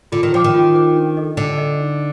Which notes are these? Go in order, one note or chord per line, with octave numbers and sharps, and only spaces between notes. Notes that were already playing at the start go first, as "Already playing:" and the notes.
D3 F4
D#3
F3 C5 G5 D6
D#3
F4
C5 G5 D6
D4
A4 D#5
D3 D4
A4 D#5
D#4